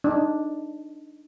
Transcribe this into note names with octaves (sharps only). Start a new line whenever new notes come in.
D4 D#4